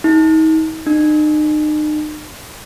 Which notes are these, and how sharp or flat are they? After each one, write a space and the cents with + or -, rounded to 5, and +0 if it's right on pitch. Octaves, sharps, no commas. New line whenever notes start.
D#4 +35
D#4 -40